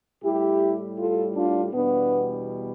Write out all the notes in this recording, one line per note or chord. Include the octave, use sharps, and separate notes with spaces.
A2 G3 E4 G4
F4 A4
D4 F4
E2 B2 G3 B3 D4